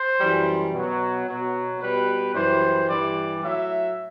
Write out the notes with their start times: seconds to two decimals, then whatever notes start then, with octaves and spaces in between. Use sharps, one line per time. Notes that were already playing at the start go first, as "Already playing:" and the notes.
Already playing: C5
0.20 F#2 E3 G3
0.73 B2 F#3
1.27 B2 F#3
1.80 B2 G3 B4
2.34 F#2 E3 G3 C5
2.88 G2 E3 G3 D5
3.42 A2 F#3 E5